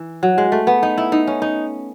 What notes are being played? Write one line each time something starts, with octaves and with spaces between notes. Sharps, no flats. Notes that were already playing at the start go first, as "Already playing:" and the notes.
Already playing: E3
F#3
G#3
A3
B3
D#4
E4
D#4
C#4
D#4